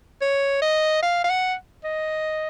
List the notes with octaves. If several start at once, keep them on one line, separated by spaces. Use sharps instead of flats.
C#5
D#5
F5
F5
F#5
D#5